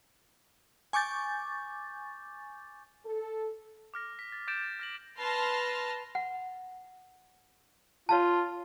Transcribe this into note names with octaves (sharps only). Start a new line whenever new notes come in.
G#5 C#6 D6 G6 A6
A4
D6 F6 A#6
B6
A6
D6 G6 A6 D7 E7
F6 A#6 F#7
B4 A5 C6 F6 A#6
F#5
F4 C#5 F5 A5